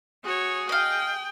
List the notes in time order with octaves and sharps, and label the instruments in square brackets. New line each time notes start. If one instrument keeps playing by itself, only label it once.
[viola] F#4 C#5 [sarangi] G#4
[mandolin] D#5 F5 [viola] G5